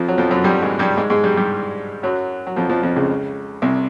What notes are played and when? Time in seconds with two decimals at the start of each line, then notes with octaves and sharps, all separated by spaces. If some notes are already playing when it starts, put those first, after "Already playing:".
Already playing: F2 F3
0.08 F#3
0.18 F2 F3
0.31 F#2 F#3
0.44 G2 G3
0.62 G#2 G#3
0.79 G2 G3
0.97 G#2 G#3
1.10 G#2 G#3
1.24 G2 G3
1.37 G2 G3
2.03 F#2 F#3
2.47 F#3
2.56 F2 F3
2.69 F2 F3
2.83 F2 F3
2.96 C#2 C#3
3.62 C2 C3